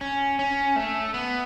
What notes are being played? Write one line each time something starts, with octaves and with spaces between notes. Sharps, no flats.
C#4
C#4
A3
B3